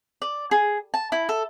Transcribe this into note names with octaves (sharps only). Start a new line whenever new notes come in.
D5
G#4
A5
E4
A4